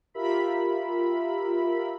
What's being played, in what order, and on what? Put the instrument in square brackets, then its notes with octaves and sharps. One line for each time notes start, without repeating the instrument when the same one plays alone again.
[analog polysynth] F4 G4 A#4 E5 B5